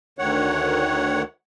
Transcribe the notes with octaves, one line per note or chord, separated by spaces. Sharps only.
D2 D#3 C#5 F#5